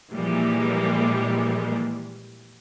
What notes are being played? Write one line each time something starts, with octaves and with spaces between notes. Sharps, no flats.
A#2 E3 F3 G3 G#3 A#3